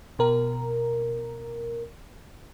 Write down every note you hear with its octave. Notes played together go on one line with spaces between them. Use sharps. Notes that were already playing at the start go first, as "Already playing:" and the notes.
B2 A#4